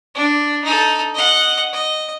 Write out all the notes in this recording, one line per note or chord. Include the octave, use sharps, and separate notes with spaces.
D4
D#4 A4
D#5 F#5
D#5